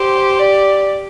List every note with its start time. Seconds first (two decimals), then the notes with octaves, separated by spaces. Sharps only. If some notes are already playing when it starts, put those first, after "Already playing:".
Already playing: G4 C5
0.39 D5